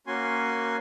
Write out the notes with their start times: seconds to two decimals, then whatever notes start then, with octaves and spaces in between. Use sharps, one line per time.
0.07 A#3 C#4 F#4 G#5 C6